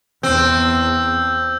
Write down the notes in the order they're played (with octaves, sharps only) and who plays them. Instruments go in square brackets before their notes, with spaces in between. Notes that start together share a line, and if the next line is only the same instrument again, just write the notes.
[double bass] E2 [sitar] C4 [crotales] E6 G6